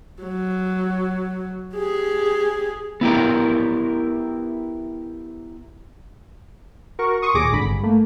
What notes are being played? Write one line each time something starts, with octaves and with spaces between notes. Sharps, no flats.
F#3
G4 G#4
B3 E4 G4 A#4
F#4 A#4 C#6
C6 C#6 D#6
D#2 A#2 G#4 D6 A#6
G#1 D3 B5
G2
A3 A#3